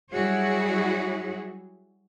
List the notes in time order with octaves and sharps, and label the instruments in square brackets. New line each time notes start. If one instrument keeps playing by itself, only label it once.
[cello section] F#3 G3 E4 F#4 G#4 C#5